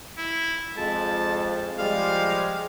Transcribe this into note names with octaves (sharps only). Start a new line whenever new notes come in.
E4
F2 G#3 A5
F3 G3 G#3 F5